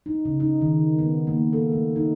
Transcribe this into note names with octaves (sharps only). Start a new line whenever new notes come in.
D#4
C#3
D#4
D#3
B3
A#3
A4
A3
D#4